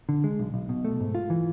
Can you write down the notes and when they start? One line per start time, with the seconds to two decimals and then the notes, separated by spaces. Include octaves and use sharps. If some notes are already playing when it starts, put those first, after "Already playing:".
0.09 D3
0.24 G#3
0.39 B1
0.54 B1
0.69 B2
0.85 A3
1.00 G#2
1.15 F4
1.30 E3